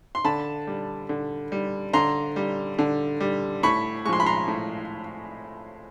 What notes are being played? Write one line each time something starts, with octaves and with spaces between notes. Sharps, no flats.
C6
D3 A5 B5
G3
D3
G3
D3 A#5 C6
G3
D3
G3
A2 B5 C#6
F3 G#3 C6 C#6
B5
A#5 C6
A2